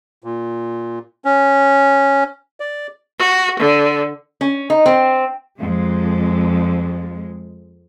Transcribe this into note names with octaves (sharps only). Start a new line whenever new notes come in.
A#2
C#4
D5
F#4
D3
C#4
D#4
C4
F2 G#3